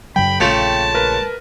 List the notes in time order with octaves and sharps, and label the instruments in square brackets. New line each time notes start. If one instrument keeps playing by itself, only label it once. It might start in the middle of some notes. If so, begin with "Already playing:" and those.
[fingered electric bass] F#2 C#3 F#3 [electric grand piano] G5 [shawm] B5
[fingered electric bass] A#1 [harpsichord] C#3 F3 A3 [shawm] A5
[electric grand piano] A#4 B4